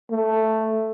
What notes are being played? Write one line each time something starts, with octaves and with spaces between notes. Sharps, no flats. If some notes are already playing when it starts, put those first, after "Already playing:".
A3